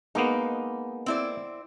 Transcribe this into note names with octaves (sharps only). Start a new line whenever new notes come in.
G#3 A#3 B3 D#4
C4 E4 D5